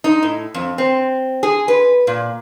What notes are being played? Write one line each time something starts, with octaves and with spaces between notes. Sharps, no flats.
D#4
A2
F2
C4
G#4
B4
A#2